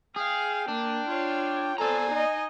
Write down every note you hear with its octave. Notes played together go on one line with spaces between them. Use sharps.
G#4 F5 G5
A#3 D4
F4 C#5
A4 C5 D5 G#5 A#5
D#4 D#5